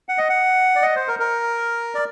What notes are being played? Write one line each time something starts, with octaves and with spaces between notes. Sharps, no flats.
F#5
D#5
F#5
D5
D#5
C5
A#4
A#4
D5